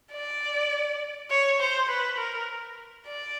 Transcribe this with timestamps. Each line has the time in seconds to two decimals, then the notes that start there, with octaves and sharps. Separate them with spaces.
0.13 D5
1.30 C#5
1.60 C5
1.89 B4
2.18 A#4
3.07 D5